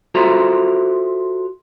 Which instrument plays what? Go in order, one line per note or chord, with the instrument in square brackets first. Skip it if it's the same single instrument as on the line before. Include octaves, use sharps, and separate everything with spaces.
[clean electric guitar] F4 F#4 A4 C5 E5 A#5